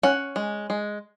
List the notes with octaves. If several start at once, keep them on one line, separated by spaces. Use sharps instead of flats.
C#4 F#5
G#3
G#3